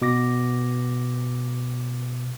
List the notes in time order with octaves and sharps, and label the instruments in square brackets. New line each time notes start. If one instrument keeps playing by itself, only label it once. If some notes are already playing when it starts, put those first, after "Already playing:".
[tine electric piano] B2 D6 A#6